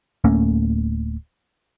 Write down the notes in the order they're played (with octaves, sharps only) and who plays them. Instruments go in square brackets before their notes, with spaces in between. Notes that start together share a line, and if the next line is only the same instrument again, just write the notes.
[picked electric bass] D1 A3 A#3 C#4